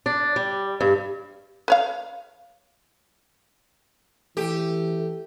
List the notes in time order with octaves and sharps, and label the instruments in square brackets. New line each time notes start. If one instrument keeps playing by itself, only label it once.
[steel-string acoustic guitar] D4
G3
G2
[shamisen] B4 C#5 F5
[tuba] E3 [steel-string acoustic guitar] A3 [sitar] G4